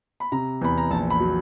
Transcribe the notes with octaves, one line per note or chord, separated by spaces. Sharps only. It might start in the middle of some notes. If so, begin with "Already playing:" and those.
B5
C3 A#5
E2 B5
A#5
A#1 A5
B5
F#3